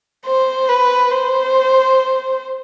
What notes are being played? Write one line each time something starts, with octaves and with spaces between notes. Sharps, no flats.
C5
B4
C5